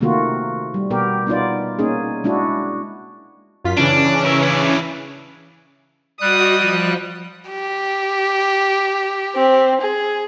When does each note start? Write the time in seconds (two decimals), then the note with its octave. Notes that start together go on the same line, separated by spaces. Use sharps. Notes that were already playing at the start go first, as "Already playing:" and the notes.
0.01 C3 D#3 A3 A#3 F4 F#4
0.74 G3
0.90 B2 B3 G4 A#4
1.27 B3 D#4 F4 D5
1.79 A#3 C#4 D#4 G#4
2.24 G#3 D4 E4 F#4
3.64 F#2 F4 B6
3.78 C#3 E3 C#4 D4
4.26 A#4 E5
4.43 D4 E4
6.21 G3 F#4 D#5 D#6 F#6
6.55 F3
7.50 G4
9.35 C4
9.81 G#4